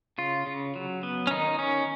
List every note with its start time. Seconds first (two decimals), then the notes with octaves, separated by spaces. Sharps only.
0.18 C#3 F4
0.47 C#3
0.76 F#3
1.03 B3
1.27 C#4
1.31 D#3 D#4
1.59 C#4